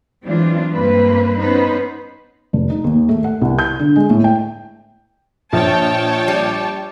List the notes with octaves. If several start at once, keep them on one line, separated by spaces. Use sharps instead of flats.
E3 F#3 G#3 C4 D4 F4
G2 A#3 C4 B4
B3 C#4 D#4 B4 C5
F1
D#4
D#2
A3
F#5
C2
G6
D3
G#3
A2
G5
A#1 F3 C#5 G5 A5
G3